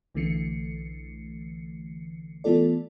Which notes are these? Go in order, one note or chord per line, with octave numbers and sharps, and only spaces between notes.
B1 D3 E3 A3 C7 C#7
E3 A3 B3 F4 A4 D5